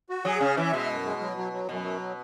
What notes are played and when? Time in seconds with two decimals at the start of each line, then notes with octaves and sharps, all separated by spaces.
0.09 F#4
0.25 F#3 G#4
0.41 C#3 C#4
0.57 E3 E5
0.73 B2 G#3
0.89 F#2
1.04 G#3
1.21 F#3
1.37 F#3
1.52 F#3
1.69 F#2 B2
1.84 F#3